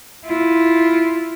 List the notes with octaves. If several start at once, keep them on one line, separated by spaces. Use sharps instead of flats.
E4 F4